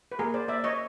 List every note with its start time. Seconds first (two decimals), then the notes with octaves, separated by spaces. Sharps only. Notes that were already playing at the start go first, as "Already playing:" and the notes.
0.12 B4
0.19 A#3 G#4 A#4
0.34 C5 D5
0.48 A#3 D5 E5
0.64 C#5 D#5